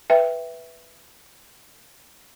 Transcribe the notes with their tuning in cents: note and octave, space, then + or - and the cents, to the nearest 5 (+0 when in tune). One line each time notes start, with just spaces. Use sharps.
B4 +0 E5 +0 G5 +0